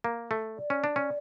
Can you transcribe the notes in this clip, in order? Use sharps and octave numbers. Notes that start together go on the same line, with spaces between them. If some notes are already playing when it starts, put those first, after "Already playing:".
A#3
A3
D5
C#4
D4
C#4